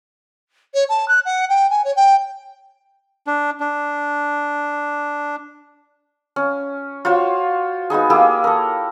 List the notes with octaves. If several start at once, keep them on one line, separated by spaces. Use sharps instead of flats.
C#5
A5
F#6
F#5
G5
G#5
C#5
G5
D4
D4
C#4
F4 F#4 C5 C#5
G#3 B3 D#4 G#4
A#3 E4 G4 G#4
A4 A#4